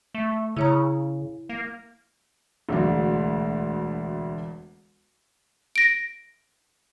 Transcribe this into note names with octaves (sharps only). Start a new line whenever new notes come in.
A3
C#3 E4 C#5 A#5
A#3
E1 D2 F#3
A#6 D7